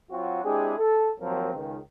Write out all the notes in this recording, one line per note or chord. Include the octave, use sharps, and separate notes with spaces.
F#3 C4 F4 F#4
G#3 C4 D4 E4 G4 G#4
A4
D#2 F3 F#3 C4 A#4
C#2 D#3